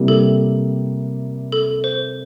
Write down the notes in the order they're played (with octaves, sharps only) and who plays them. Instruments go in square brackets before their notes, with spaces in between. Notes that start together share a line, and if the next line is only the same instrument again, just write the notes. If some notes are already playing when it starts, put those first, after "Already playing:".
Already playing: [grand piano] C3 G3 A#3 E4 A#4
[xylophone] A4
A4
C5